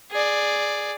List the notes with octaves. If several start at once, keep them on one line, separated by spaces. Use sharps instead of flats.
G#4 D5